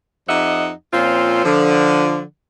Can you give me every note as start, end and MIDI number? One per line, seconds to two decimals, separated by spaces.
0.28 0.70 41
0.28 0.70 63
0.28 0.70 67
0.28 0.70 75
0.28 0.70 76
0.28 0.70 78
0.93 1.42 46
0.93 1.42 53
0.93 1.42 60
0.93 1.42 61
0.93 1.42 65
1.44 2.21 50
1.44 2.21 53